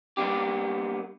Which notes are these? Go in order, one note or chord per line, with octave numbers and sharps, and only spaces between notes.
G3 A#3 B3 D4 G4